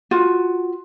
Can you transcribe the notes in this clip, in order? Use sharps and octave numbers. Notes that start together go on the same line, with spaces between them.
F4 F#4